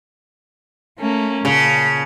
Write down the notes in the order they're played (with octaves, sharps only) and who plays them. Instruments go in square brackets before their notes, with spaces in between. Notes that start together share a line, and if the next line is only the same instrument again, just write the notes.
[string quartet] A3 A#3 C#4
[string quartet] A#2 A5 [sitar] C#3